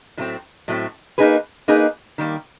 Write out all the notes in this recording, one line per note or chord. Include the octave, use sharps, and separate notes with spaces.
A2 F#3 A3 C4
A2 F#3 A3 C4
A#3 D#4 G#4 B4
A#3 D#4 G#4 B4
D#3 G3 A#3